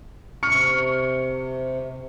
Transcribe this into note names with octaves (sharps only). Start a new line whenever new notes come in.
C3 C#6 F6 C#7